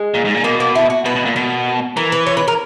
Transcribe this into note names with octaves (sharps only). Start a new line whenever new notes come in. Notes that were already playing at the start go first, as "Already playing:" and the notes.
Already playing: G#3
A#2
G#2
A#2
B2 A#3
A#3
E4
F#4
B2 B4
B2
A#2
B2 A#4
E3 A#4
B4
C#5
B4
A#4